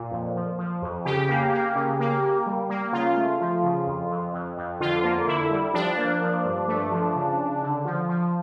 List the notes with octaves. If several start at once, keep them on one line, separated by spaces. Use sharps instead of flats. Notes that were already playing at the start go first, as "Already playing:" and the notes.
Already playing: A#2
F2
F3
F3
F2
C#3 G4
A#3
A#3
C#3
A#3
A#3
G3
A#3
C#3 F4
A3
F3
C#3
F2
F2
F2
F2
D3 F4
A#3
D3 E4
G3
F3 D4
A#3
F3
G2
A3
F3
C#3
C#3
D3
F3
F3